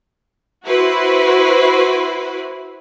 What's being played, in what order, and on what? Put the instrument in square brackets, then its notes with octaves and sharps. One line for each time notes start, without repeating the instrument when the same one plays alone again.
[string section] E4 F#4 B4 C5